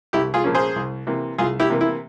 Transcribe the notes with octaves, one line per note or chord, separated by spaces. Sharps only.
C2 E4 G4
F4 G#4
A#2 F3 A#3 C#4
G#4 C5
C2
C3 E3 A#3
C2 F4 G#4
E4 G4
C3 E3 A#3
E4